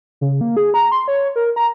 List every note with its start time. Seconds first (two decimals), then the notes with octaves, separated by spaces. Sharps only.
0.21 C#3
0.41 A#3
0.57 G#4
0.74 A#5
0.92 C6
1.08 C#5
1.36 A#4
1.56 A#5